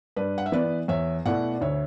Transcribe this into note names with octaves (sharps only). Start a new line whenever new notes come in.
G2 B4 D5
F#5
E5
E3 B3 B4 D5
E2 C#5 E5
B2 A3 E4 D5 F#5
D5
D2 C#5 E5